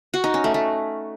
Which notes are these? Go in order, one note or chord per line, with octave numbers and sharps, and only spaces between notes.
F#4
D#4
C#4
A3
A3